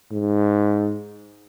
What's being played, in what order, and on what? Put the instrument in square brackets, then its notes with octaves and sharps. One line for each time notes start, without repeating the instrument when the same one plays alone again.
[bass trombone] G#2